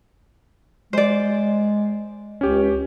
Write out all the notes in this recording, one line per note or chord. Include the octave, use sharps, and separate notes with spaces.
G#3 C5 D5
C#2 C#4 G4